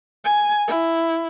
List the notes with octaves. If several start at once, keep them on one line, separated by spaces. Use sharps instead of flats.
G#5
E4